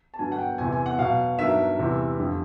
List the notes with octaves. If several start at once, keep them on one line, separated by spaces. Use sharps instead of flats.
A5
G2 D3 F#3 G#5
F#5
G5
E2 C3 E3 G#5
G#5
F#5
B2 F#3 F5
G2 D#3 F#3 E5
E2 C3 E3 G3
F2 D3 G3